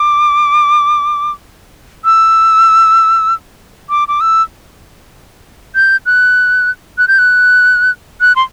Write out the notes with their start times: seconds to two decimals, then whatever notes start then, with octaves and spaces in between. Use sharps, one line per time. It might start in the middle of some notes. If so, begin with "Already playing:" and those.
Already playing: D6
2.05 E6
3.90 D6
4.08 D6
4.21 E6
5.75 G6
6.06 F#6
6.98 F#6
7.08 G6
7.19 F#6
8.21 F#6
8.36 C6